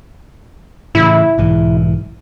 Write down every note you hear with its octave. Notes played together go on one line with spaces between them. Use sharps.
A2 C#3 E3 E4
B1 G#2 E3